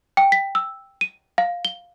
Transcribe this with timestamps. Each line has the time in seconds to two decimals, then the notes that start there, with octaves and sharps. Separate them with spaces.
0.17 G5
0.32 B6
0.55 E6
1.01 D#7
1.38 F5
1.65 G7